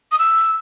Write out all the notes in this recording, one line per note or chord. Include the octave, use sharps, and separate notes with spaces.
D#6
E6